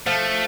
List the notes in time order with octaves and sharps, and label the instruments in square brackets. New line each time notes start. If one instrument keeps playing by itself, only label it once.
[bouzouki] F3 [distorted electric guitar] A3